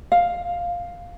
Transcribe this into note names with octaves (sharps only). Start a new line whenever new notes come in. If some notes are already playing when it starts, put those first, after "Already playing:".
F5